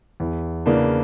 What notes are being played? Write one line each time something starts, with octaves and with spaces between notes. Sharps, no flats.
E2
C#3 E3 A#3 D4